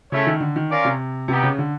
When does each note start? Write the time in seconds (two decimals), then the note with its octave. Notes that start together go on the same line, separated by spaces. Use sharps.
0.11 C#3 A3 C#4 E4 A4 C#5
0.27 D#3
0.40 D3
0.56 D#3
0.70 C#4 F4 A#4 D5 F5
0.85 C3
1.28 C3 B3 D#4 G4
1.43 C#3
1.59 D3